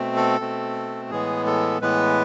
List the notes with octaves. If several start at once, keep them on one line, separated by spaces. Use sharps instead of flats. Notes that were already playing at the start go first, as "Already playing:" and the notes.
Already playing: B2 A3 C4
A4
B2 A3 C4
A2 E3 G#3 B3 G#4
A4
A2 E3 G#3 B3 B4